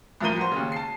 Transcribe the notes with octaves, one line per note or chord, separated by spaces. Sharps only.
C2 A2 F3 A#4 D#7 G7
F#4 C5
D#2 C#3
A5 C7